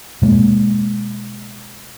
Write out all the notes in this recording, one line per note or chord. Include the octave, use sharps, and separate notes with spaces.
B2 G#3 A#3